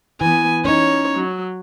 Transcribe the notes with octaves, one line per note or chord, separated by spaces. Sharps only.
E3 B3 G#5
C#4 D#4 C#5
F#3